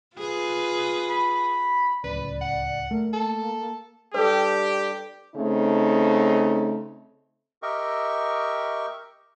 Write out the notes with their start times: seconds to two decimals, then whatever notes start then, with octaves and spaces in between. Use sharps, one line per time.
0.17 F4 G#4 B4
1.10 B5
2.04 D1 C#2 B4 D5
2.41 F#5
2.91 A3 A#4
3.13 A#3 A4
4.14 G3 D4 G4 A4 B4
5.35 C#3 A3 C4 D#4
7.63 G4 A#4 D#5 E5 G5 C#6